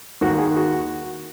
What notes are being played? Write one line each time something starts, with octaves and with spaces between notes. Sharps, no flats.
D#2 D#3 F#4
G#4
F#4